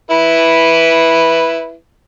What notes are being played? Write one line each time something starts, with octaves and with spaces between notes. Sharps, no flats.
E4 B4